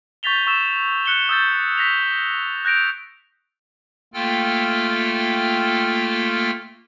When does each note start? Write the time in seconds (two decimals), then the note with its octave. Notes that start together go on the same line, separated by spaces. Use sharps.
0.23 C#6 G6 A6 B6 F7 G7
0.47 C#6 E6 E7
1.06 F#6 C#7 F7 G7
1.29 D#6 E6 G6 A6
1.78 A#6 B6 F7
2.65 F#6 G6 A#6 D7 F7
4.14 A3 A#3 F4 A4 G5 F6